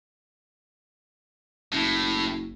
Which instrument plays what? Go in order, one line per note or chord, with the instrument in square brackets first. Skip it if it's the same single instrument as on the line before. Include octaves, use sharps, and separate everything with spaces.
[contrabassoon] F#1 [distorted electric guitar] A2